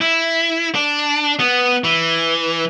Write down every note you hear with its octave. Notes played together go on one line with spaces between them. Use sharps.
E4
D4
B3
E3